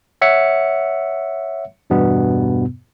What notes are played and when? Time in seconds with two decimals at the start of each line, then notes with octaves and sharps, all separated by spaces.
0.22 C#5 E5 F#5 C#7
1.90 E2 G2 B2 B3